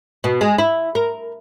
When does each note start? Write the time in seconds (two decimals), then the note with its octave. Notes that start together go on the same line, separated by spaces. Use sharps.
0.24 B2
0.41 G#3
0.58 E4
0.95 A#4